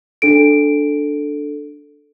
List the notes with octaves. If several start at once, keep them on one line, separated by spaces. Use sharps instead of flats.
D4 A4 D7